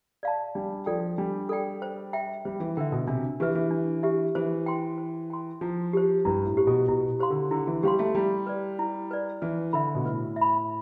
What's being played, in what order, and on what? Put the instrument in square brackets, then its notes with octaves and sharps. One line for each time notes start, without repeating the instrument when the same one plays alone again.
[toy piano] D5 F5 A5
[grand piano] G3 [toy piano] D4
[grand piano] F3 [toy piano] A4 D5 G5
[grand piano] G3 [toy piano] D4
[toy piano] A4 D5 G5
C5
E5 G5
[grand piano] G3 [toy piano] C5
[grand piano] E3
[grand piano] D3 [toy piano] E5 G5
[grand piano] B2
[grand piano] C3 [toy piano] D4
[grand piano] E3 [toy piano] G4 B4 E5
[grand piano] E3
[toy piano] D4
G4 B4 E5
[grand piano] E3 [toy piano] C5
[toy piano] G5 C6
C5
G5 C6
[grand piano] F3 [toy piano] E4
[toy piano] G4 C5
[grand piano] G2 [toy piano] E4
[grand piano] A2
[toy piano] G4 C5
[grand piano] B2
[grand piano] B2 [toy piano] E4
[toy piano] G4 C5 F5 C6
[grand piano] D3
[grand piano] D3 [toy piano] E4
[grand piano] E3
[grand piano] G3 [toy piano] G4 C5 F5 C6
[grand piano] A3
[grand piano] G3 [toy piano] E4
[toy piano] B4 D5
E4
B4 D5
[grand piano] E3 [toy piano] B4
[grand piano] D3 [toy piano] E5 B5
[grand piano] B2
[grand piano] A2 [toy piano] B4
[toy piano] E5
B5